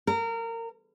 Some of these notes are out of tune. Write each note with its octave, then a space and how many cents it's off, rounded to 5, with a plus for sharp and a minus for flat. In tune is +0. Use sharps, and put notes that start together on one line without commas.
A#4 -25